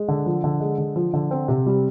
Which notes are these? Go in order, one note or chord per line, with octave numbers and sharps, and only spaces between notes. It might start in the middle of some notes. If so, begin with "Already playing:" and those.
Already playing: G#3
D3
F3
D3
G#3
D3
F3
D3
C4
C3
G3